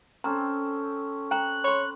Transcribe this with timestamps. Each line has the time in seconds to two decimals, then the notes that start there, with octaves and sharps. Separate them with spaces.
0.24 C4 C#4 A4 A#5
1.31 G5 A#5 F#6
1.64 C#5 B5 C6